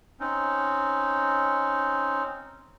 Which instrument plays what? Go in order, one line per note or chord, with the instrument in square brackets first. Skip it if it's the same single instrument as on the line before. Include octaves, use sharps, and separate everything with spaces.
[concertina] C4 C#4 D#4